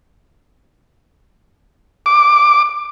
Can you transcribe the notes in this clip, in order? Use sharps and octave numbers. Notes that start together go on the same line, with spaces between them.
D6